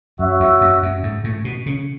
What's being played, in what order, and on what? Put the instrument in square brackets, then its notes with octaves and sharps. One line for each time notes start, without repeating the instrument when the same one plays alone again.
[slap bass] F#2 [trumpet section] F#4 C#5 E5
[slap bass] E2
F#2
F#2
G#2
A2
B2
C#3